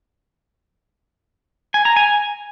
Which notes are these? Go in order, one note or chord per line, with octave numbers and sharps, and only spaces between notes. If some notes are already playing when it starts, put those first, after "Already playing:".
G#5
A#5
G#5